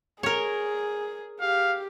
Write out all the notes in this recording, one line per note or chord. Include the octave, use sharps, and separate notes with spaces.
G#4 A#4 C#5
G4 F5